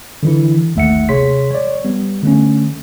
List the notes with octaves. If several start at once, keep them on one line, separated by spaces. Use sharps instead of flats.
D3 E3 E4
G#1 D#2 A3 E5 F#5 C#7
C3 G#4 C#5 C6 B6
C#5 D5
G3 B3
D3 A3 C#4